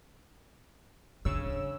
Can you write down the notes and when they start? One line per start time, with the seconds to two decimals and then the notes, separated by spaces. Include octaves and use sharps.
1.25 C#3 D4 C#5 E6